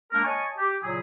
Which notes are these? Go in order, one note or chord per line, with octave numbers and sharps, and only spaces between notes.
G#3 A#3 D4 A#4
C#5 D#5 G#5 A5 C#6
G4
A#2 C#3 F#3 E4 G#4